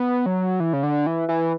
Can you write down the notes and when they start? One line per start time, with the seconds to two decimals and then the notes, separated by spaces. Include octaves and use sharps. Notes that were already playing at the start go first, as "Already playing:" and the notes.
Already playing: B3
0.26 F#3
0.60 E3
0.73 C#3
0.83 D3
1.07 E3
1.28 E3